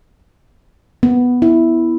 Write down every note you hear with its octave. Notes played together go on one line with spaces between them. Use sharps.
B3
E4